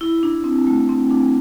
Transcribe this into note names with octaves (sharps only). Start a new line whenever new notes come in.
E4
D4
C4
A3
C4
D4